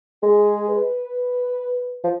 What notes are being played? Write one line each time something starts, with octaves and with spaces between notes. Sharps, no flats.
G#3 G#4
B4
F3